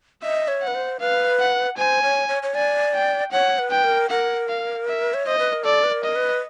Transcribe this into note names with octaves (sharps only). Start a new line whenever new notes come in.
D#5 E5
C#5
F#5
B4
C5
B4 F5
F#5
C5 G#5
C#5
C#5
C#5
D5 G#5
G5
C#5 F#5
B4
G5
A#4
A#4 F#5
F5
E5
C#5
C5 D#5
B4
A#4
A4 D5
B4
A#4
D#5
B4